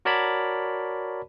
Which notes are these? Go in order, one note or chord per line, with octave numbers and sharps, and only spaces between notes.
F#4 A#4 C#5 D5 A5 B5